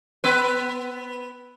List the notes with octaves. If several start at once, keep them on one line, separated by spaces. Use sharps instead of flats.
B3 B4